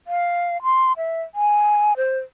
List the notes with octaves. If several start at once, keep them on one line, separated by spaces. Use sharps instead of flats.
F5
C6
E5
G#5
C5